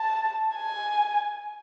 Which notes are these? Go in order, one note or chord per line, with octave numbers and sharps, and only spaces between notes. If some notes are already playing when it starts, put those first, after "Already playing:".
Already playing: A5
G#5